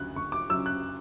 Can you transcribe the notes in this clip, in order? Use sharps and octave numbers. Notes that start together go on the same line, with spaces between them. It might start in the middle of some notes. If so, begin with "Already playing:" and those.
Already playing: D2 C#3 F#3 F#6
D2 C#6
D6
C#3 F#3 E6
F#6